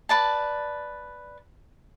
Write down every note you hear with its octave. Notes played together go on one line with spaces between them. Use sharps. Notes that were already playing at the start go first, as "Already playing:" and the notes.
B4 D5 A5